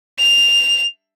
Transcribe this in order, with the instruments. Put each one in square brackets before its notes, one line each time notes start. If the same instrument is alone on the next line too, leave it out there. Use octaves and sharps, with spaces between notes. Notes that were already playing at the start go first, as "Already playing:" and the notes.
[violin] F7